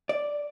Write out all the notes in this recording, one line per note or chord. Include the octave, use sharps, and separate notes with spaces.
D5